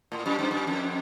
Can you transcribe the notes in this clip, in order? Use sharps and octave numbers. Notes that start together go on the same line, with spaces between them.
A2
F#2
G2
F#2
F2